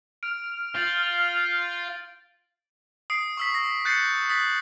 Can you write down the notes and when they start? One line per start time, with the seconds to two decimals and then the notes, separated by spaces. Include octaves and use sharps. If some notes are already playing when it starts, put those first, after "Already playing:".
0.23 F6 D7
0.75 F4 G6 A6 F#7
3.10 D#6 C7 D7
3.37 C#6 E6 B6
3.54 A#6
3.85 F#6 G6 A6 C7 C#7
4.29 D#6 A6 B6 F#7